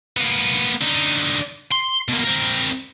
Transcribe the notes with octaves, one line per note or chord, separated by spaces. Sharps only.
A#3 B3
D3 D#4
C6
B2 A#3
C4 A#4